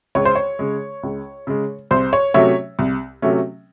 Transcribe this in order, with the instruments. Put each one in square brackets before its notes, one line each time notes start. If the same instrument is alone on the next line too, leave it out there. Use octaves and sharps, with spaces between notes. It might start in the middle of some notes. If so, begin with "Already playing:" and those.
[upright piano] C#2 C#5
C5
C#5
C#3 G#3
C#2
C#3 G#3
C2 C5
C#5
C3 F#3 A3 C#4 C#5 E5
C2
C3 F#3 A3 C#4